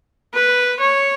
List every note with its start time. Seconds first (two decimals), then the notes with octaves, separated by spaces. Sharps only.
0.34 B4
0.80 C#5